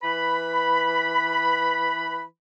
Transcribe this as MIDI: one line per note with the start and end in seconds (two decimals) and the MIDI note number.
0.02 2.22 52
0.02 2.22 71
0.02 2.22 83